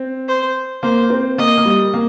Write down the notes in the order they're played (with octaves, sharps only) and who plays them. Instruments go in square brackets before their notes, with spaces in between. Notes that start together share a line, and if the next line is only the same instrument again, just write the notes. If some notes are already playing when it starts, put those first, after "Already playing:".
Already playing: [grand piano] C4
[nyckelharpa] C5
[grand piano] A#3 [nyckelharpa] C5
[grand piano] C4
[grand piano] A#3 [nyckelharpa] D#5
[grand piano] A#3
G3
A#3